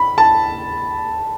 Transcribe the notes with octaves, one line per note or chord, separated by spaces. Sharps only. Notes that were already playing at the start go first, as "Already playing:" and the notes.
Already playing: B5
A5